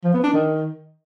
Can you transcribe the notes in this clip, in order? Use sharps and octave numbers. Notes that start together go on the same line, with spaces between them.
F3
B3
D4
D#3